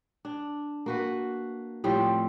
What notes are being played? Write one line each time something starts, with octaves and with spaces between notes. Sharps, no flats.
D4
A#3 F#4 B4
A2 F3 G3 C4